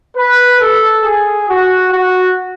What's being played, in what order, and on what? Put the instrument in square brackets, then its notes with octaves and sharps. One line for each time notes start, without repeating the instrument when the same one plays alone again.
[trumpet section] B4
A4
G#4
F#4
F#4